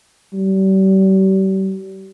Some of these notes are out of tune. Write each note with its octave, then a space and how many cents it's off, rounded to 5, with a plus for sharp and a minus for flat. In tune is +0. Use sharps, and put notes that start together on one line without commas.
G3 -40